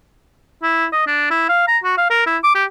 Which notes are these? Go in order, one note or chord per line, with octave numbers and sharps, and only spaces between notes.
E4
D#5
D4
E4
F5
A#5
F#4
F5
A#4
E4
D6
G4